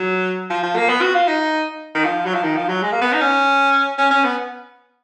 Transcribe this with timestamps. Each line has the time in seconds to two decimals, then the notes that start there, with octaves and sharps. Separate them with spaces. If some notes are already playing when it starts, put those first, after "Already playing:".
Already playing: F#3
0.50 F3
0.63 F3
0.76 A#3
0.89 B3
1.02 F#4
1.14 F4
1.28 D#4
1.95 D#3
2.05 F3
2.26 F#3
2.34 F3
2.43 D#3
2.56 F3
2.69 F#3
2.82 G#3
2.92 A#3
3.02 B3
3.13 D#4
3.21 C#4
3.98 C#4
4.11 C#4
4.24 B3